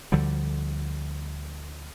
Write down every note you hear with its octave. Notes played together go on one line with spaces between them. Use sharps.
D2 D3 F3 G3